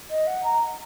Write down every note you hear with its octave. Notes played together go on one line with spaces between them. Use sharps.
D#5
F#5
A#5